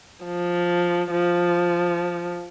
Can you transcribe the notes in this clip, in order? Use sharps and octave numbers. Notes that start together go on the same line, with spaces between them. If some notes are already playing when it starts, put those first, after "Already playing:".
F3
F3